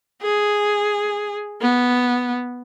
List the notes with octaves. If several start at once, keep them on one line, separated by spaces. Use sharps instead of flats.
G#4
B3